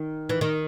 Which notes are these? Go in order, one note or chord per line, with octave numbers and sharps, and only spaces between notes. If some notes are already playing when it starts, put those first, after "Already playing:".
Already playing: D#3
E3
D#3